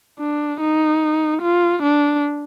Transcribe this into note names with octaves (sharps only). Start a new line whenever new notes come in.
D4
D#4
F4
D4